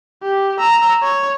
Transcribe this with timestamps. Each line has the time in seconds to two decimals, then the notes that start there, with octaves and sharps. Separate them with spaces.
0.23 G4
0.60 A#5 E6
1.02 C#5